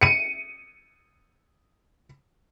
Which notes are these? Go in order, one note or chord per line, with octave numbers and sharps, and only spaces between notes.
C#7 D#7